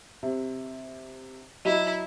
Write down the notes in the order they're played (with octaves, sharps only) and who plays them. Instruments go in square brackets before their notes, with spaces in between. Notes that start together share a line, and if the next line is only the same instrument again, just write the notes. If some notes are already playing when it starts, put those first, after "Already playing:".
[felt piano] C3
[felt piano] F#3 F#4 [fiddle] E4 [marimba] D#5